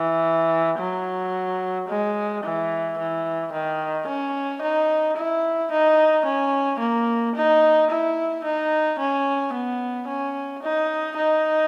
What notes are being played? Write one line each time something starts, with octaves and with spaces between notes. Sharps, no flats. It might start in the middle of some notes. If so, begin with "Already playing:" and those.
Already playing: E3
F#3
G#3
E3
E3
D#3
C#4
D#4
E4
D#4
C#4
A#3
D#4
E4
D#4
C#4
B3
C#4
D#4
D#4